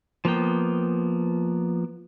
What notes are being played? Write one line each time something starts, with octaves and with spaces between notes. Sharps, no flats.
F3 A#3 B3 G5